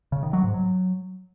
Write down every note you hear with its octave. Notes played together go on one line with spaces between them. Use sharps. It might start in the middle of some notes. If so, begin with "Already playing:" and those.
C#3
D#3
F#3
G#2
F#3